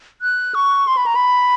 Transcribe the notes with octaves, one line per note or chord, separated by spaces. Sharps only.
F#6
C#6
C6
B5
A#5
B5